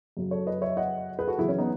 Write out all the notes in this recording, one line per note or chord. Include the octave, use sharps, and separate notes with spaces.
F#2 C#3 F#3
A4 C#5
B4 D#5
C#5 E5
D#5 F#5
G#4 B4
F#4 A4
F#2 C#3 E3 E4 G#4
C#4
B3 D#4